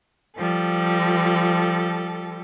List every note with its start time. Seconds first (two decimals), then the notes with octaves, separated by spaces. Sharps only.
0.37 F3 G3 A4